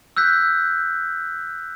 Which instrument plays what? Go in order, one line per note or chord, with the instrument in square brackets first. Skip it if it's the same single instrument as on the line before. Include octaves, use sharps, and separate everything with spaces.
[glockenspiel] E6 F#6 G6 B6